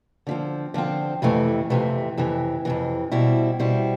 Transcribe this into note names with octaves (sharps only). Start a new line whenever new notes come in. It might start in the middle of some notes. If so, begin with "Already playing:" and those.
D3 F3 C4
D3 F3 C4
F2 C3 E3 A3
F2 C3 E3 A3
F2 C3 E3
F2 C3 E3
B2 G3 C4 E4
B2 G3 C4 E4